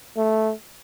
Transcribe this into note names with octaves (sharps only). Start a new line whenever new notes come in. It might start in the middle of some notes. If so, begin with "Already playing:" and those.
A3